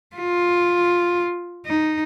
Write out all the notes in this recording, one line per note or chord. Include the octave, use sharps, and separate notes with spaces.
F4
D#4